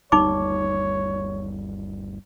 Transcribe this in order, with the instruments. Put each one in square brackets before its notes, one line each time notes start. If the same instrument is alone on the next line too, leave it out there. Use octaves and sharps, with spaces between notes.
[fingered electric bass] G1 D#2 G3 [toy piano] D#4 D6 [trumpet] C#5